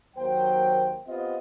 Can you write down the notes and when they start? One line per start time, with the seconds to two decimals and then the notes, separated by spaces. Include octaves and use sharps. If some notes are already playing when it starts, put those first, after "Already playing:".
0.17 D#2 F#3 A#3 C5 G5
1.07 B3 C4 F4 G4 D#5